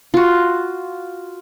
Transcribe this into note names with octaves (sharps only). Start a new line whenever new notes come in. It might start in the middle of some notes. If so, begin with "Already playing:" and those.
F4 F#4